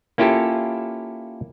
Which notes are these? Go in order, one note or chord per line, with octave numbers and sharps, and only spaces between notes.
A#3 C#4 E4 F4 G4 A4